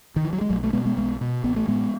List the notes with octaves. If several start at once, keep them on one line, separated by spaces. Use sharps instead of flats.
D#3
E3
F#3
G#3
B1 F#3 A3
A3
B2 G#3 B3
G#3 B3
B1 G#3 B3
B2
A1 B3
A3
A2 G#3 B3